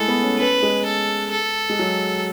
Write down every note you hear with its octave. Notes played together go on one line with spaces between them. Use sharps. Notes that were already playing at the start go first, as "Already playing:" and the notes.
Already playing: G#3 A3 E4 G#4 A4
B3
C#4
C#4 B4
G#3
A4
A4
G#3
F#3